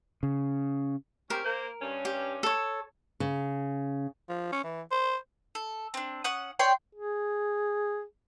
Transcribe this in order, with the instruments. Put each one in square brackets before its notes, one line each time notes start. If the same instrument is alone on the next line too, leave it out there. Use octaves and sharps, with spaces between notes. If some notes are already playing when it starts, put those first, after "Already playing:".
[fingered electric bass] C#3
[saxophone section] C4 C#4 G4 [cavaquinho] A#4
[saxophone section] A#3 C5
G2 C#4
[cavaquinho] G4
A4 C#5
[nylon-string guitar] C#3
[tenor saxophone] F3
C#4
E3
C5
[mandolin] A4
C4 D4
C#4 F#5 D#6
C#5 D5 G5 C6
[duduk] G#4